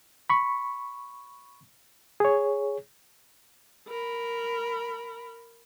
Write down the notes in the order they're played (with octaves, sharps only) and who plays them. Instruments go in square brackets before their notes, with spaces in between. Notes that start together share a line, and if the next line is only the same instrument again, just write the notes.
[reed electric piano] B5 C#6
G#4 C#5
[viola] A#4 B5